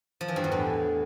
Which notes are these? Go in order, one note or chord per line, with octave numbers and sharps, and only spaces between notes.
F3
E3
G2
E2
A2